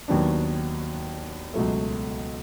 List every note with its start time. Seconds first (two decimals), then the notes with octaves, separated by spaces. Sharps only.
0.08 D#2 D#3 F#3 B3 D4
1.54 C#2 B2 F#3 A3